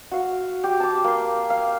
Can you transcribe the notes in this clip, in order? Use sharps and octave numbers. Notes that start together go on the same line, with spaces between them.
F#4 F5
G4
A5 D6
A#3 C6
F5